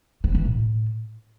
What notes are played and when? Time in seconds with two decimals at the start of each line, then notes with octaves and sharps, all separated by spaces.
0.24 C4
0.35 E3
0.45 A2